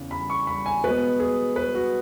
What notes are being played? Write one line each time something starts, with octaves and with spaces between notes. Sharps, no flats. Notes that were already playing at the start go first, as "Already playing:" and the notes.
Already playing: E2 C#3 E3
B5
C#6
B5
G#5
B2 G#3 B3 B4
G#4
B4
F#4